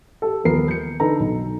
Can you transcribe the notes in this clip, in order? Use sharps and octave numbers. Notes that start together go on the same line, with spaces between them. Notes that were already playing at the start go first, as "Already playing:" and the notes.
G4 A4
D#1 F3 B3 A#4 C7
G6 C#7
D3 D#4 A4 B4 A#5
B1